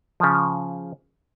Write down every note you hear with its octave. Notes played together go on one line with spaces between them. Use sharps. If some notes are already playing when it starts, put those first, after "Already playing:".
C#3 F3